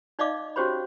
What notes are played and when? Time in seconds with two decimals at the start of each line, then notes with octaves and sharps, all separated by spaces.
0.19 D#4 D5 D#5 F5 D6
0.56 C#4 F#4 G4 C5 C#5 B5